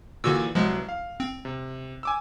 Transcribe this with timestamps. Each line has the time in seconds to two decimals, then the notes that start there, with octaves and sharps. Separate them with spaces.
0.24 A#2 D3 E3 F#4 E6
0.55 C2 F3 F#3 G#3 B3
0.89 F5
1.20 C4
1.45 C3
2.03 G#5 D6 E6